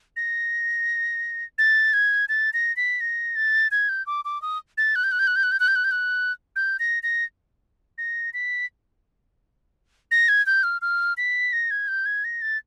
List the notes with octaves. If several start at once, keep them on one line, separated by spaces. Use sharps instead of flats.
A#6
A6
G#6
A6
A#6
B6
A#6
A6
G#6
G6
D6
D6
D#6
A6
F#6
G6
F#6
G6
F#6
G6
F#6
G6
F#6
G6
F#6
G6
F#6
G6
A#6
A#6
A#6
B6
A#6
G#6
G6
F6
F6
B6
A#6
G#6
G6
G#6
A#6
A6